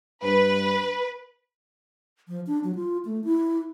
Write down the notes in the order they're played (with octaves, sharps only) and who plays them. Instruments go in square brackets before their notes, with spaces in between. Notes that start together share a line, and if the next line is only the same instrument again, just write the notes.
[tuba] G2 [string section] B4
[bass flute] F3
D4
F#3
F4
A3
E4